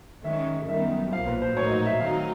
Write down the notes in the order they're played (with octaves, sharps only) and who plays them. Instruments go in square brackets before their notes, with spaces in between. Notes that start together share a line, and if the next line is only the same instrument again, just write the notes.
[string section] D#3 G#3 C#4 [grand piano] E5
[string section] F#2 D#3 G3 B3 [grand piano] E5
[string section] B1 A#2 F3 A#3 [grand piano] F5
[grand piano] B4
C5
[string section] A#1 A2 F#3 A#3 D#4 [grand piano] C#5
[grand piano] D#5
E5
[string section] D#3 F#3 A3 C4 D#4 [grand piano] F5